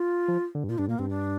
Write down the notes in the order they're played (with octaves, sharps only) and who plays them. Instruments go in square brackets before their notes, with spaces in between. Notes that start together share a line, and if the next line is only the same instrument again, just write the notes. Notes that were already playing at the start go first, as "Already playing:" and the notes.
Already playing: [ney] F4
[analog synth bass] F3
D3
G2
[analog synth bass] A#2 [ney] F4
[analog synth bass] G2 [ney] D4
[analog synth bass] A#2 [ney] A#3
[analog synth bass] G2 [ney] C4
[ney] D4